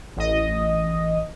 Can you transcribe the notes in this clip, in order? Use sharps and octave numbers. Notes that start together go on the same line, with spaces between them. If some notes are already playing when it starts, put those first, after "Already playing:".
A1 D#5